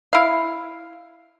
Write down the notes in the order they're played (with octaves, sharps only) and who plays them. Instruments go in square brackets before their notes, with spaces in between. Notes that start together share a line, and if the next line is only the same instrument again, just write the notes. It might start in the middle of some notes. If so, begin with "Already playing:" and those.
[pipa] E4 F5